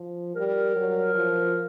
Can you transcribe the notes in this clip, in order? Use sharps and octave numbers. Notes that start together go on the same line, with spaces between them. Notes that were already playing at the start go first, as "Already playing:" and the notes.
Already playing: F3
G3 A#4
F#3
F3